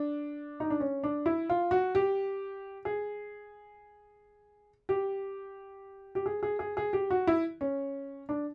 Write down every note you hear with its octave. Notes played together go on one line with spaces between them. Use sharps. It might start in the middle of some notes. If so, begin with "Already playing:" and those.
Already playing: D4
D#4
D4
C#4
D4
E4
F4
F#4
G4
G#4
G4
G4
G#4
G#4
G#4
G#4
G4
F#4
E4
C#4
D4